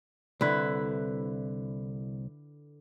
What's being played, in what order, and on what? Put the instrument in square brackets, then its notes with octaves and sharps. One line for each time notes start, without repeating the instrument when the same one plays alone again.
[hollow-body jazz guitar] C2 [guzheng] D3 E4 B4